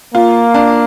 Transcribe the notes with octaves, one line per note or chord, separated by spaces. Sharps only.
A#3 F4
D4